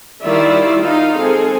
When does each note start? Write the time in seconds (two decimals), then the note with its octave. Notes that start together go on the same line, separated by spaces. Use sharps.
0.24 D#3 G3 E4 F4 D5 E5
0.81 D#4 F4 D#5 F5
1.17 G#3 C4 G#4 A4